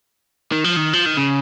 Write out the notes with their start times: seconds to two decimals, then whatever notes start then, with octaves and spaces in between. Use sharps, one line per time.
0.52 D#3
0.64 F3
0.76 D#3
0.93 F3
1.06 D#3
1.17 C#3